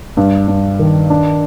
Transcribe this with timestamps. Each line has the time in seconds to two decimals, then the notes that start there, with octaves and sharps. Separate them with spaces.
0.17 G2
0.48 G2
0.79 D#3
1.10 D4